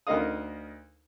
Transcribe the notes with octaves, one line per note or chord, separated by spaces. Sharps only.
D2 D#4 A#4 D#5 F5 D#6